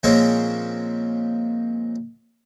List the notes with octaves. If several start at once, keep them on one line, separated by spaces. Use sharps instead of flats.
A#2 F3 G#3 C4 C#4 G#4